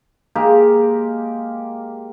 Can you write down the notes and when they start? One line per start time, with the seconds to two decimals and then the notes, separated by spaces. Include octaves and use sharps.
0.36 G#3 A#3 G4 A#4